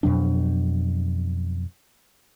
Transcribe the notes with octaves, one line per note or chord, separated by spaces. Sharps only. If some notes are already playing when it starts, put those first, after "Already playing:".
F2 B2 F#3 D4